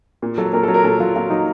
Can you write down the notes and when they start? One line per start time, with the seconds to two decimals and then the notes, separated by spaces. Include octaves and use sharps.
0.22 A#2
0.38 F#3 A4
0.53 A#2 A#4
0.63 F#3 A4
0.74 A#4
0.84 A#2 A4
1.00 F#3 F4
1.15 A#2 F4
1.30 F#3 D#4